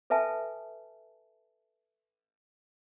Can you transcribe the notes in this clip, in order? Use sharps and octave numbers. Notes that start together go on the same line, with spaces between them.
A4 B4 E5 G#5 A5